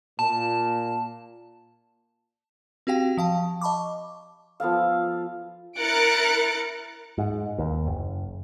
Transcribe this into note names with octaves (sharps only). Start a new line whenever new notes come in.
A#2 A5
C4 F#4 G4 F5 G5
F3 F5 A5
D#5 A5 B5 C#6 D6
F3 B3 A4 F5
E4 A#4 F#6 A6 C#7 D7
G#2
D#2
F#1